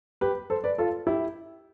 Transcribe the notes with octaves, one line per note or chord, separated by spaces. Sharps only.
G4 B4
A4 C5
B4 D5
F4 A4
E4 G4